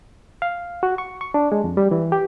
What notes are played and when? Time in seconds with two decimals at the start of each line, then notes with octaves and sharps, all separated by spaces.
0.42 F5
0.83 F#4
0.98 C#6
1.21 C#6
1.34 D4
1.52 G#3
1.64 F2
1.77 G3
1.91 E3
2.12 G4